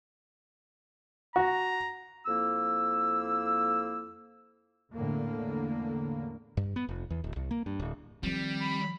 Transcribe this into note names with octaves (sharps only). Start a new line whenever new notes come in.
F#4 A#5
F2 A#3 E4 E6
E2 A2 D3 A#3
G2
B3
F1
E2
D1
C2
A#3
G2
D1
D#3 F3 G3 C4
B5